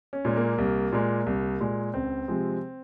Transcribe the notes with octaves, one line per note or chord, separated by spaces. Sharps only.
C#4
A#2 G#3
A#3
C2
A#2 G#3
C2
A#2 G#3
C#2 C4
C3 F3 G#3